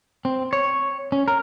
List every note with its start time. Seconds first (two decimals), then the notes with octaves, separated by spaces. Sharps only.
0.25 C4
0.53 C#5
1.12 C#4
1.28 A#4